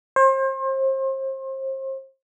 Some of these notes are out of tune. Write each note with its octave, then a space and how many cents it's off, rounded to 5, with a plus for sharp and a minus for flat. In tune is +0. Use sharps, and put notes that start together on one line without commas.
C5 +35